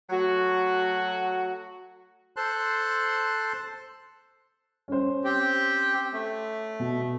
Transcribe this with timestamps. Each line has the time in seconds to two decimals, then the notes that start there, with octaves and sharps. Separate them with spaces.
0.10 F#3 A3 F#4
2.36 A4 C5 A5 C6 F#6
4.88 C#4 C5
5.24 C4 G4
6.13 A3
6.79 B2